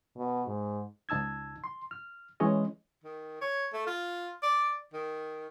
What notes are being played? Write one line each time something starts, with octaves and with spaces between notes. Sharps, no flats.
B2
G#2
C#2 D#4 A5 E6 G#6
C6
F6
E3 G#3 C#4 C#5 D#5
D#3
C#5
A3
F4
D5
D#3